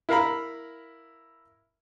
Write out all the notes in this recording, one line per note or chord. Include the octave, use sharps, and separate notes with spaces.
E4 A#4 F5 A#5 B5